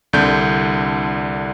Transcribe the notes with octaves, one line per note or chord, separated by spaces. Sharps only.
C2 D3 D4 G6